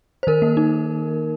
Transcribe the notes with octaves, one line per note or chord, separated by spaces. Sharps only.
C5
D#3 A#4
A#3
D#4